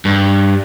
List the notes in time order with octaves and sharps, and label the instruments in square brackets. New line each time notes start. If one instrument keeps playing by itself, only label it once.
[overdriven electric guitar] G2